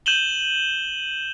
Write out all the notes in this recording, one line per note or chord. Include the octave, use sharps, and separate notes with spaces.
G6 D#7 E7 F#7 G7